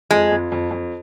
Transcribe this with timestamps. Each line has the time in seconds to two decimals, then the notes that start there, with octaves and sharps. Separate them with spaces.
0.11 F2 G#3
0.31 F2
0.52 F2
0.71 F2